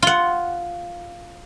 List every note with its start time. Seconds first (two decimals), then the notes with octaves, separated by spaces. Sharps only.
0.02 F4 F#5